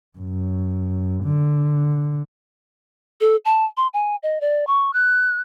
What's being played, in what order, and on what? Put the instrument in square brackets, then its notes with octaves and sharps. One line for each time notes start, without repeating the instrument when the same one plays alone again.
[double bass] F#2
D3
[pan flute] A4
A5
C6
G#5
D#5
D5
C#6
F#6